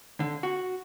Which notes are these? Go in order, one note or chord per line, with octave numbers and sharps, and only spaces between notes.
D3
F#4